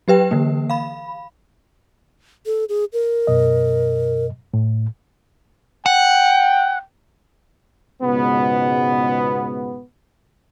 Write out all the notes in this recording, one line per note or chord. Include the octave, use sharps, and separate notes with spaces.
F#3 G4 B4 G5
D3 E3 A#3
F5 B5
A4
G#4
A#4
F#2 B2 D#5
A2
F#5 G5
C#2 G#2 B2 B3